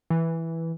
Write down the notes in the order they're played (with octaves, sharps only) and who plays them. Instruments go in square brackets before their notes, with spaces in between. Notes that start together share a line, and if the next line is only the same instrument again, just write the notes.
[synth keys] E3